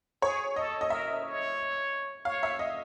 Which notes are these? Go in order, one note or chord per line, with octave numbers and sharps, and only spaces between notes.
G#4 C#5
A4 D#5
D#5
A#4 E5
C#5
C#5 F5
E5
D#5